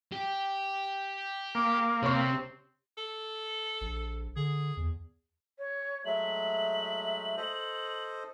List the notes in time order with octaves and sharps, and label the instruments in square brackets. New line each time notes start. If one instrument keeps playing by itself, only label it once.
[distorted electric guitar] G4
[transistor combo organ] A#3 [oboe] D6
[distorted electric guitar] C3 [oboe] C4 [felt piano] C#5 C#6
[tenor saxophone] A4
[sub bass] A#1
[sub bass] D3 [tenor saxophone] G#4
[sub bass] E2
[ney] C#5
[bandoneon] F#3 G#3 A3 [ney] E5 [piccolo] F#7
[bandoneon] A4 C5 D#5